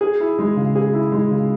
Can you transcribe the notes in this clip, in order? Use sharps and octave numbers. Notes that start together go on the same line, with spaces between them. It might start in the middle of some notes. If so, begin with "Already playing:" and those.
G#4
E4
G#3
C#3
G#4
E4
G#3
C#3